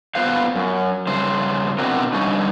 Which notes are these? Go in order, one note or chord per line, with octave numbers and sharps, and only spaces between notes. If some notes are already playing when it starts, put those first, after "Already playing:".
B3 F4 B4 C5 F5
F#2
G2 C#3 C5
B2 C4 D4 E4 F#4 A#4
G2 D3 C#4 D#4